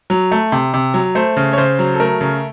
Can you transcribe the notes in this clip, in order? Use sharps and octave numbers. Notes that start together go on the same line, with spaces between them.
F#3
A3
C3
C3
F#3
A3 C5
C#3
C#5
C#3 C5
F#3
A4
A3 A#4
C#3